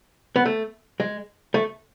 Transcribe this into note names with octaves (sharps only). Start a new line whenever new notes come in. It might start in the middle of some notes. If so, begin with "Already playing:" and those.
B3
A3
G#3
A3